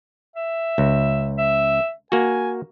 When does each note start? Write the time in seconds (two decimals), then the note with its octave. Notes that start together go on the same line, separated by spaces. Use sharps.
0.36 E5
0.78 C#2
1.38 E5
2.12 A#3 F#4 G#5